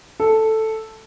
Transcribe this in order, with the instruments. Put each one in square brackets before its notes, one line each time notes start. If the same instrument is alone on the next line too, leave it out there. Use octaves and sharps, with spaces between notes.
[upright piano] A4